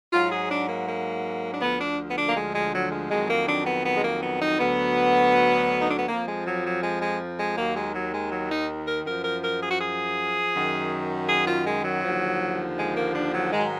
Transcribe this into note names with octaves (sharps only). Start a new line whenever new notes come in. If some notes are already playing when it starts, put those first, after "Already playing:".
G#2 F#3 F4
G#4
D4
A#3
A#3
D4
D2 D3 F3 B3
D4
B3
D4
A#3
G#3
G#3
F#3
G#3
F2 D#3 F#3 G#3
A#3
D4
B3
B3
G#3
A#3
B3
D#4
D2 D3 F#3 B3
D#4
D4
B3
F2 F3 A#3
G#3
F#3
F#3
G#3
G#3
G#3
D#2 D#3 F#3 A#3
G#3
F#3
G#3
F#3
D#4
A#4
F#2 F3 A#4
A#4
A#4
G#4
F#4
G#4
F#2 D#3 F#3
G#4
F4
G#3
F#3
D#2 D3 F3
G#3
A#3
D4
F#3
G#2 D#3 F#3 G#3